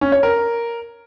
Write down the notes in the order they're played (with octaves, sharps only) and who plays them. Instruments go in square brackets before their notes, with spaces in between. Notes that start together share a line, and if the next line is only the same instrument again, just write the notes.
[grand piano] C#4
C#5
A#4